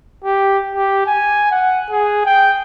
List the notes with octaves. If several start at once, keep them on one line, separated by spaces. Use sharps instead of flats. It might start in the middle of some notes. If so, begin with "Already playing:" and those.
G4
G4
G#5
F#5
G#4
G5